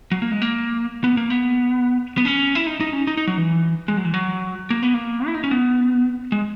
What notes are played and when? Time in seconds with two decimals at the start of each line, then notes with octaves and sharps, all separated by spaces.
0.12 F#3
0.22 A#3
0.31 G#3
0.42 A#3
1.04 B3
1.17 A#3
1.30 B3
2.17 B3
2.25 C#4
2.55 E4
2.66 D#4
2.81 D#4
2.93 C#4
3.07 D#4
3.17 D#4
3.27 F#3
3.38 E3
3.88 G#3
3.97 F#3
4.05 E3
4.14 F#3
4.70 A#3
4.83 B3
4.94 A#3
5.26 E4
5.34 D#4
5.44 C#4
5.51 B3
6.32 G#3